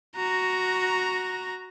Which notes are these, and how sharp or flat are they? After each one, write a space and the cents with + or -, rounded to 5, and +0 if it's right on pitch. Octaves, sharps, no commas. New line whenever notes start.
F#4 +0 A#5 +0